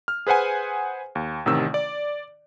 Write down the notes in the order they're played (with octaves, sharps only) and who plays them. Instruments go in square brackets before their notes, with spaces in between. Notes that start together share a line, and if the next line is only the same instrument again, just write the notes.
[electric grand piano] F6
G#4 B4 C5 F#5 G#5
D#2
A1 C3 D#3 E6
D5